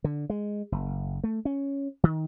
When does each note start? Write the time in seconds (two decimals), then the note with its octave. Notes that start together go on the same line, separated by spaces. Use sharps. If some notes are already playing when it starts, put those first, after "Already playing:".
0.04 D3
0.30 G#3
0.72 F#1
1.24 A3
1.45 C#4
2.03 D#3